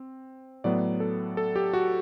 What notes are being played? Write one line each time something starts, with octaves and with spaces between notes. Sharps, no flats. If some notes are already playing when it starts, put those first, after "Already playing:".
Already playing: C4
A2 F#3 B3 D5
A4
A4
G4
F#4